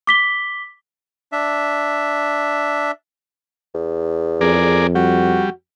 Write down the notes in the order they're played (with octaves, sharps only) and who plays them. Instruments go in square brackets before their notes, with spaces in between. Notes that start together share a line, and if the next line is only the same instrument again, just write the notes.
[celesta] D6 B6 G7
[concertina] D4 E5
[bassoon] E2
[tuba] F2 [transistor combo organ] G#4 A#4 D5
[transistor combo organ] G3 [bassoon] F#4